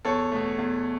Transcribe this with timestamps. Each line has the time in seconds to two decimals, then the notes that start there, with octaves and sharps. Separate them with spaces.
0.05 E2 A4 C#5
0.32 B2 A3
0.58 E2